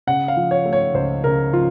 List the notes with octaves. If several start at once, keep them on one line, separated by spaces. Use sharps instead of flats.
C#3 F#5
F5
F3
C#5
A3
C#5
C#2 C5
C#3 A#4
F3 F4